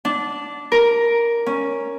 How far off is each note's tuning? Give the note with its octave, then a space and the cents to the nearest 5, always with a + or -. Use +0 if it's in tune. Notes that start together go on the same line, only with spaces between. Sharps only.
D4 -15
A#4 +5
C#4 +0